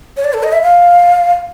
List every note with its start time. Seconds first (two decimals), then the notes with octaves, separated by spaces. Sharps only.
0.17 C#5
0.24 D5
0.33 A4
0.43 D#5
0.52 E5
0.63 F5